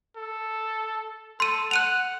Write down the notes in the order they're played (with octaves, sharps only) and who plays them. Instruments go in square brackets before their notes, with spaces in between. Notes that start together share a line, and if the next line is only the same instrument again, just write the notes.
[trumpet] A4
[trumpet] A4 [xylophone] C6 D#7
[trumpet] F#5 [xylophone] F#6 D#7 F7